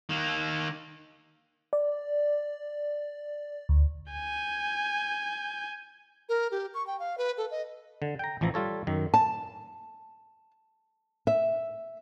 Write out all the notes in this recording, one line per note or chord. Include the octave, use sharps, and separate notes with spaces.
D#3 A#3
D5
D2
G#5 G6
A#4
G4
C#6
G5
F5
B4
A4
D#5
D3
G5 A#5
A1 E3 F3 E4 A#5
G3 F4 A4 C#5
F#2 D#3
A5
E5